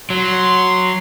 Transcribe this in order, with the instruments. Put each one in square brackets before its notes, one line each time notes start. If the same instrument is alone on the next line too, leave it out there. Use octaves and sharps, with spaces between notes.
[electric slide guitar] F#3 [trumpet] C6